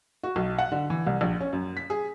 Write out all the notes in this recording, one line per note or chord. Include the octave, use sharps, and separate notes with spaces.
F#4
B1
F#5
D3
E3
C2
A#1
C#4
F#2
B6
G#4